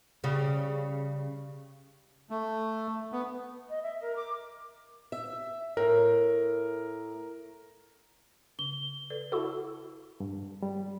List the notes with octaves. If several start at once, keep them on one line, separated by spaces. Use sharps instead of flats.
C#3 G3
A3
B3
D#5
E5
A#4
D6
E5
A2 A#4
C#3 G7
A4 B4 D5
E4 F#4 A4 F#5
G2
G3